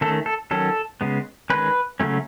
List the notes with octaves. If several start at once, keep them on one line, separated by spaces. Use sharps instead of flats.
D#3 A3 C#4 A4
A4
D#3 F#3 C#4 A4
C#3 G#3 B3
D#3 G#3 C#4 B4
C#3 F#3 A3 C#4